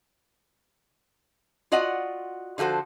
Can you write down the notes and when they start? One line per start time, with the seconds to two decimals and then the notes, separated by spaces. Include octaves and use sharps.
1.72 F4 F#4 D5 D#5 F#5
2.58 D3 F3 F#4 A4 C5